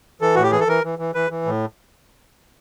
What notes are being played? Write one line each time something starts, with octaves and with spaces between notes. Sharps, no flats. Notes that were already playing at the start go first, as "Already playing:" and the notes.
E3 A4
A2 F#4
G4
E3 G#4
A4
E3 A#4
E3
E3
E3 B4
E3
A2